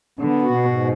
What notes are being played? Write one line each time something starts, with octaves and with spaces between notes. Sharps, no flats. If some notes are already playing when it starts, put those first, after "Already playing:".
D3 B3
F#4
B2
G#2